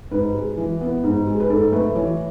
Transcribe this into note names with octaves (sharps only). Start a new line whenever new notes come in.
G#2 B4
G#3
E3
B3
G#2
G#3
B4
G#2 A4
A3 B4
E3 C#5